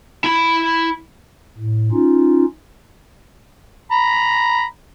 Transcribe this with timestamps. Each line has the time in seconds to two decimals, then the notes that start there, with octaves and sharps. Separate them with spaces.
0.24 E4 B5
1.57 A2
1.92 C#4 D#4 F4
3.91 A#5 B5